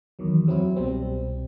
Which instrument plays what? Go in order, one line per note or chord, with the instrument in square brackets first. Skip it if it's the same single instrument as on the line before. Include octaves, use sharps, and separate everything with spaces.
[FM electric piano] E2 D#3 F#3
F#2 F#3 C4 E4
C2 B2 G3 C4